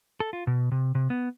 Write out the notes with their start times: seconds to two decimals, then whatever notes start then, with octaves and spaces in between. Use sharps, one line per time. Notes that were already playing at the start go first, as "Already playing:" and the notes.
0.20 A4
0.33 F4
0.47 B2
0.72 C3
0.95 C3
1.10 B3